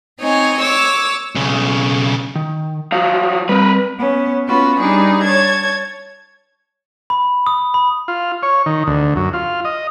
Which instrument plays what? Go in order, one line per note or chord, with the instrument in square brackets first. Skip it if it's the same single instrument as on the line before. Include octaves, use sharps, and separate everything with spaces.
[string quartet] C4 D#4 C#5 G#5
C#5 D6 E6
[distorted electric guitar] B1 C#3
[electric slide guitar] D#3
[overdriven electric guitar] F3 F#3 [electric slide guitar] F5
[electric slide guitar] G3 C4 [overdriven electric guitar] A#4 B4
[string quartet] B3 C#4
B3 C#4 F4 F#4 B4
G3 D4 D#4 G#4 B4
C#5 A5 G#6
[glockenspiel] B5
D#6
B5
[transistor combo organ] F4
C#5
D#3
D2
F#2
F4
D#5